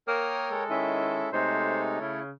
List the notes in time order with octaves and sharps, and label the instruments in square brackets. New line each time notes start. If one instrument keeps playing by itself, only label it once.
[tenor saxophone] A#3 [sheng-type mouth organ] A#4 C#5 G5 [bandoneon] D#6 F6
[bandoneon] G#3 A4
[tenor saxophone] D#3 [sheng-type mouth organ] C#4 E4 E5
[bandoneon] C3 G#3 D#4 [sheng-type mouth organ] A3 A4 C#5 [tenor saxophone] C5
[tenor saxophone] C#3 [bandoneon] E4